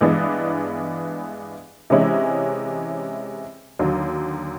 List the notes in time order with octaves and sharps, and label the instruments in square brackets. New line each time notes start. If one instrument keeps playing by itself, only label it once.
[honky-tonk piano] G2 E3 G#3 B3 D4
C3 E3 G#3 C#4 E4
D#2 D3 F#3